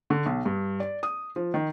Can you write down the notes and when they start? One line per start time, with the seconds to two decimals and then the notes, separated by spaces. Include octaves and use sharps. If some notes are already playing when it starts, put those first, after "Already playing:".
0.10 D3
0.26 B1
0.45 G2
0.80 D5
1.03 D#6
1.36 F3
1.54 D#3